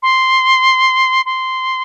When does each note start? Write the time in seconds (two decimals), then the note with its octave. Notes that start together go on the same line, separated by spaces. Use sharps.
0.02 C6
1.25 C6